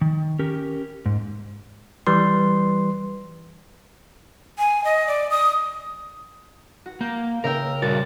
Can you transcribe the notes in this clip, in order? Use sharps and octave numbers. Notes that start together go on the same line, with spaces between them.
D#3
C#4 G4 A#4
G#2
E3 G3 B4 C6
G#5
D#5
D5
D#6
F#4
A#3 G6
C#3 A#4 E5 G5
A#2 G3 F#4 A6